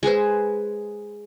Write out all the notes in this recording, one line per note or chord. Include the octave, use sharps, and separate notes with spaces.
G#3 G#4 B4 C5